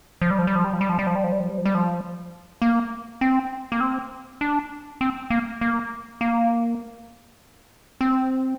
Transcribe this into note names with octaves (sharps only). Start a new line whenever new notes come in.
F3
G3
F3
G3
F3
G3
F3
G3
F3
G3
F3
G3
F3
G3
F3
G3
F3
G3
F3
A#3
C4
A#3
C4
D4
C4
A#3
A#3
A#3
C4